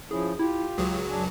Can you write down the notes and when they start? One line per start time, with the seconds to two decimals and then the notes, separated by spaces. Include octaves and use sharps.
0.11 F3 C#4 E4 G#4
0.39 E4 F4 G4
0.78 C#2 F#3 G#4
1.09 F#2 D4 G#5